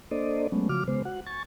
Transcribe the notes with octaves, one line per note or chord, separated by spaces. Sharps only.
A#3 D4 A4 C5 D5 D#5
F#3 G#3 A3 B3 C#4
C#3 F3 F#4 D6 F6
C#3 G#3 B3 C5
F#4 F#5
G#5 C#6 A6